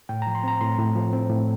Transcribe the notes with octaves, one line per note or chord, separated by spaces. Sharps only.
A2 G5
A#5
F3
C6
C4 A#5
A2 C6
A2
F3
C4
A2